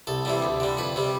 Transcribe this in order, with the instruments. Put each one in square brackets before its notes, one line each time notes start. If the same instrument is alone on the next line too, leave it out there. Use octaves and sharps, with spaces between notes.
[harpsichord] C2 A4
C3 E3 G3
D2
D3 G3
F2 B4
C3 G3